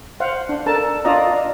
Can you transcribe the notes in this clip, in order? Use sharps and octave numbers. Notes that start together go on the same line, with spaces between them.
C5 F5 F#5
D4
D4 A4 A#4 A5
D4 F4 D5 D#5 A#5